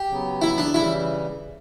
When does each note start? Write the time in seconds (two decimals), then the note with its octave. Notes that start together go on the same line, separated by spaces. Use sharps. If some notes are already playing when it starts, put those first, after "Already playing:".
Already playing: G4
0.08 C#3 F#3 B3
0.42 E4
0.58 D4
0.74 C#3 E3 G3 E4